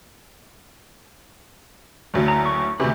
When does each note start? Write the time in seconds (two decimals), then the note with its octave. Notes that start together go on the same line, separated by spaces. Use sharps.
2.14 F#1 D2 F#3
2.28 A#5
2.45 C#6
2.80 D2 C3 F#4 G#4 B4